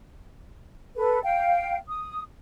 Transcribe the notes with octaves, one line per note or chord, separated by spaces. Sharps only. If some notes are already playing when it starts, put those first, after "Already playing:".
A4 B4
F5 G5
D#6